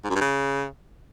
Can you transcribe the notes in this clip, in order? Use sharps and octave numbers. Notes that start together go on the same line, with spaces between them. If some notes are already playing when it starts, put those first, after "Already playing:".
G#2
F#2
G2
C#3